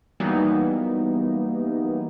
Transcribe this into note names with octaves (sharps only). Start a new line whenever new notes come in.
E3 F#3 G3 A#3 B3 D#4